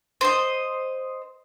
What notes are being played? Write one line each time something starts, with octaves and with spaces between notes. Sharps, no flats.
C5 D#5